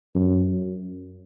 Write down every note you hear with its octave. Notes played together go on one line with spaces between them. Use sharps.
F#2